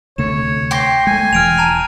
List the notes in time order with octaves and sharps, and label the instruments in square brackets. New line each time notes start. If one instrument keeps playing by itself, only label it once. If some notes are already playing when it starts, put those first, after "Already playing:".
[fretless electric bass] D2 C3 A3 [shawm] C#5 [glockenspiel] E7
[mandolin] G5 C6 D6 [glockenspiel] G6 A#6 C7
[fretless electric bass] G#3 A3 [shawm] G#5
[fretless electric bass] E1 E3 [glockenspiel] F6 D7 F7
[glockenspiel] A5 A#5 F7